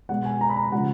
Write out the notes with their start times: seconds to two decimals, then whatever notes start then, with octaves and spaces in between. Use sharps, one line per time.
0.09 B2 G#3 B3 F#5
0.25 G#5
0.41 A#5
0.49 B5
0.56 A#5
0.72 C#3 F3 G#3 F#5